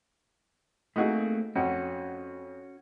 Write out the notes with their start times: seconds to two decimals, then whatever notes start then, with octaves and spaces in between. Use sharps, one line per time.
0.96 A3 A#3 C4 D#4 F#4 G#4
1.56 F2 C#4 F#4